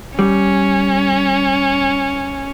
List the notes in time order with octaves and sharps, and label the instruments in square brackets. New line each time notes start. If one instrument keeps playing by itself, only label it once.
[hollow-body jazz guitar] G3 [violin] C#4